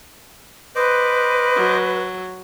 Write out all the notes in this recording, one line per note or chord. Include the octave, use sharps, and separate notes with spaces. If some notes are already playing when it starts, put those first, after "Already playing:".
B4 C5 D#5 D6
F#3